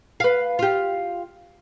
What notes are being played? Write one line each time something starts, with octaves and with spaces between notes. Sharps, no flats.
B4 F5
F4 G4